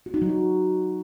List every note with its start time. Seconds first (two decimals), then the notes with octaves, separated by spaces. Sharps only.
0.06 F#4
0.14 D#4
0.22 F#3
0.29 F#4